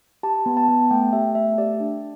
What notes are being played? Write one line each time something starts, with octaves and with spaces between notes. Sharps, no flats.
G4 A5
B3
A5
B3
A3 G5
G4 E5
A3 E5
G4 D5
D4